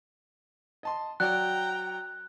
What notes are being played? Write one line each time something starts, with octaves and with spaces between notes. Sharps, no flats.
D#5 A5 C6
F#3 F#4 D5 G5 A#5 F#6